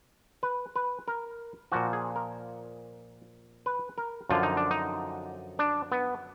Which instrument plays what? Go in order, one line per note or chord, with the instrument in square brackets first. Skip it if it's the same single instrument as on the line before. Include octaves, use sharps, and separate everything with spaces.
[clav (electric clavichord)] B4
B4
A#4
A#2 F3 F#4
G#4
A#4
B4
A#4
F#2 D3 F3 F4
D#4
D4
D#4
D4
B3